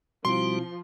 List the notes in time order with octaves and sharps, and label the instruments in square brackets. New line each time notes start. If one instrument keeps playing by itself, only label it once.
[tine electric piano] B2 C4 E4 [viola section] F3 [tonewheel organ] G3 F#4 [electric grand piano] C6